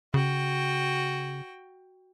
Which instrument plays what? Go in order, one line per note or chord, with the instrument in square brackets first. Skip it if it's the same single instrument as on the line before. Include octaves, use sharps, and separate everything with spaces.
[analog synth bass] C#3 [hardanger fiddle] F#4 G5